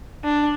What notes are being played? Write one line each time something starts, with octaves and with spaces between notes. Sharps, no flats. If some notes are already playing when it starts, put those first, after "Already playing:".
D4